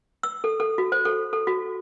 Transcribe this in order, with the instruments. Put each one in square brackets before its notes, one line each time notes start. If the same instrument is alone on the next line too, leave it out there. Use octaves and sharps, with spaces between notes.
[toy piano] E6
A4
A4
F#4
C5
A4
A4
F#4